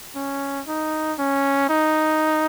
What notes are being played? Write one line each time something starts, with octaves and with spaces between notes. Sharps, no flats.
C#4
D#4
C#4
D#4